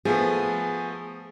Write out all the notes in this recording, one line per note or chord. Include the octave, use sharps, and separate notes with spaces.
F3 A3 B3 G#4